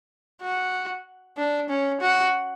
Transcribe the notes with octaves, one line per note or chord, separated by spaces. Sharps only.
F#4
D4
C#4
F#4